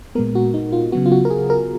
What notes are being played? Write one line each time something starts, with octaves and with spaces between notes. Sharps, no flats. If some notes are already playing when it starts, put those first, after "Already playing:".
A#2 G#3 B3 A#4
F#4
D#4
F4
C#3 F#3 B3 F#4
F4
F#4
A#4
G#4
A#4